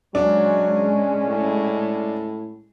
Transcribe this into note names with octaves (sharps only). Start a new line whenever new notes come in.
F#3 G#3 C#4 D4
A2